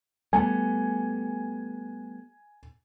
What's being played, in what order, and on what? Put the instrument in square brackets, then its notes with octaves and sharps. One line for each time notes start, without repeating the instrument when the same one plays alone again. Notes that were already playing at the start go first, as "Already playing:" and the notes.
[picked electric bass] G3 A3 B3 [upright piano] G#5